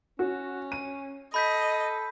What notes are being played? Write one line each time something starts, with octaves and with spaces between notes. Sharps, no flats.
C#4 F#4
D#7
A4 D#5 B5 G6 B6